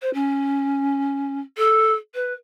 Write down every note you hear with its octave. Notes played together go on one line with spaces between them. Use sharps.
C5
C#4
A4
B4